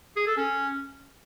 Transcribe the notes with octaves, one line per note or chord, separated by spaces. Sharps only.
G#4
A4
C#4